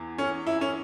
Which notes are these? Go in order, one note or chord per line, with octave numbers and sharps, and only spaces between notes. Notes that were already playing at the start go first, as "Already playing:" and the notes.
Already playing: E2 E3
C#4
E4
C#4